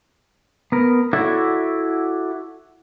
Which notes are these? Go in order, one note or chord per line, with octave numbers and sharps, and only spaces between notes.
B3 A#4
E4 F#4 A4 C#5 D5 E5